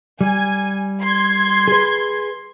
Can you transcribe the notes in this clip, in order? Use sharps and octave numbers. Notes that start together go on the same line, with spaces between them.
G3 G#5
C6 G#6
G#4 B4